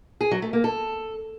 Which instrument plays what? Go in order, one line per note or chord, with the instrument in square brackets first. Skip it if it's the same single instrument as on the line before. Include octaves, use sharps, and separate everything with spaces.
[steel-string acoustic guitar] G#4
F#3
A3
A#3
A4